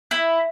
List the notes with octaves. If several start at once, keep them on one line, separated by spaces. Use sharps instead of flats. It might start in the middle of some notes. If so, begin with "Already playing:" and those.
E4